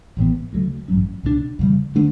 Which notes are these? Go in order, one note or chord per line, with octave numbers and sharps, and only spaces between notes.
A1 A2 E3 B3
D2 C#3 F#3 A3
A1 G2 F#3 C#4
C#2 B2 G3 D4
E2 C#3 G3
D3 A3 D4